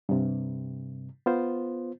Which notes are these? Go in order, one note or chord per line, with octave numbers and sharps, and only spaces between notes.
G2 C3
B3 F4 C5